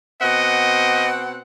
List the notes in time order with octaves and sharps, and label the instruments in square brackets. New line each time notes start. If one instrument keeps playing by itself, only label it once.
[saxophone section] B2 C4 F#5 [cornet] D#5